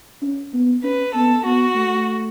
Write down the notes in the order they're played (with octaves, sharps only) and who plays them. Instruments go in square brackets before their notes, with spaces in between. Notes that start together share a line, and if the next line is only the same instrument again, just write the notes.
[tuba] C#4
B3
[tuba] C#4 [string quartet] B4
[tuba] B3 [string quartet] A4
[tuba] B3 [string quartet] F#4
[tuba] A3